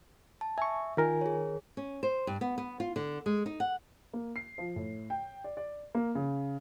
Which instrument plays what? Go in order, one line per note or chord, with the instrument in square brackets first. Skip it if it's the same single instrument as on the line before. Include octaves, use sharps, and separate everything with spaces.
[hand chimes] A5
[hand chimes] E5 [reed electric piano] G#5 C#6
[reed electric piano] D#3 A#4 [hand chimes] F4 G#5
[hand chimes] G#4 C#5
[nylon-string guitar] C#4
C5
G2
B3
B3
F4
D3
G#3
D#4
F#5
[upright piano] A#3
C7
F3
A2
G5
D5
D5
A#3
C#3